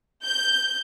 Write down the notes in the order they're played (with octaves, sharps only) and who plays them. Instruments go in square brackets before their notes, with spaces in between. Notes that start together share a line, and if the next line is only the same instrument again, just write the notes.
[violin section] G6